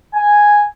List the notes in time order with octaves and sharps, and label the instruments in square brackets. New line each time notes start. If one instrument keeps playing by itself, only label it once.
[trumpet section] G#5